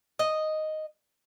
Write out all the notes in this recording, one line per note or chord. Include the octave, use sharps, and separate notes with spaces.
D#5